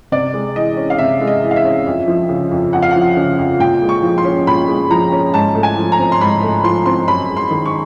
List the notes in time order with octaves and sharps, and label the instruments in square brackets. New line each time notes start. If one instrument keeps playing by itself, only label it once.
[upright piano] C3 D5
G#3
E3 D#5
C#4
F5
C3 E5
G#3
D#5
E3
F5
E5
C#4
F2
F3
C#3
F2
F2 F#5
F5
F3 F#5
C#3
F2
A#2 G5
G#3
C#6
F3
C6
C#4
A#2 B5
G#3
F3 A#5
C#4
G#2 A5
A3
G#5
F3
A#5
C4
C6
G#2 B5
A3
F3 C6
C4 C6
F#2 B5
G#3
C6
D#3
C#6